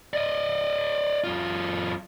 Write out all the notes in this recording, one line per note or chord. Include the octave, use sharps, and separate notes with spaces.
D5 D#5
F#2 F4